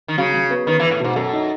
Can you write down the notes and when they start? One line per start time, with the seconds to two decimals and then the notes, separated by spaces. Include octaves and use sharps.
0.08 D#3
0.18 C#3 F#3
0.34 F#3
0.51 B3
0.67 D#3 B4
0.80 E3
0.83 B4
0.91 A2
1.00 G#2 B2
1.16 F#2 A4
1.33 D#4